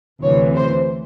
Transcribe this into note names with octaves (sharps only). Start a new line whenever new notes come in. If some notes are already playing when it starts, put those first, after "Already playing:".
D2 C3 E3 C#5
C5